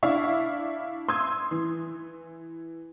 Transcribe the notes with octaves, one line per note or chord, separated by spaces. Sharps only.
D4 E4 E5 F5 C#6
C6 D#6 E6 G#6
E3